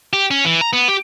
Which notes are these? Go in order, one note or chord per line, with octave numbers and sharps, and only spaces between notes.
G4
C#4
E3
A#5
B3
G4